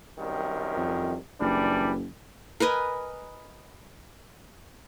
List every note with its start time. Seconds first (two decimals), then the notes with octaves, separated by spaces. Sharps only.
0.19 C2 F#2 D#3
0.76 F2
1.41 F#1 E3 G3 D4
2.60 A#4 B4 D#5 G#5